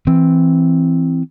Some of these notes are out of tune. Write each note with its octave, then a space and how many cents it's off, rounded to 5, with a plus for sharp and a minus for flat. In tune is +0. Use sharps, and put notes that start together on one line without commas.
E3 +5 C4 +0